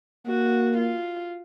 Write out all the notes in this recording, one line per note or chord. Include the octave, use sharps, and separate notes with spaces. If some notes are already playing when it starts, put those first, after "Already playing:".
A#3 F#4
F4